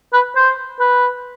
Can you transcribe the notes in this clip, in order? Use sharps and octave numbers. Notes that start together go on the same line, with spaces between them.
B4
C5
B4